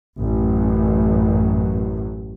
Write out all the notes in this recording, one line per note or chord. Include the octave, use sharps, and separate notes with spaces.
A1 F#2